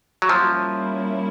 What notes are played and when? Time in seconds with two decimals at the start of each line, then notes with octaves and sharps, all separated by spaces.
0.22 F#3
0.29 F3 G3 A#3 C#4 E4